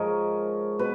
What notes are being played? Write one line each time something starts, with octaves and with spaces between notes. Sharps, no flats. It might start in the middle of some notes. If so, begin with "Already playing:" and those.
Already playing: G#2 F3 G#3 A#4 C#5 D#5
B2 B4